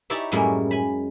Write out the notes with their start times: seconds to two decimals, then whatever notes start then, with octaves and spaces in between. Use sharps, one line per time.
0.10 D#4 E4 G4 C#5 D5 E5
0.32 F#2 A2 G3 G#3 A#3 C#4
0.71 G#5 B5